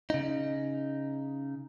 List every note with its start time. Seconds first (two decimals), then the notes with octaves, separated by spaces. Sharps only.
0.10 C#3 D#4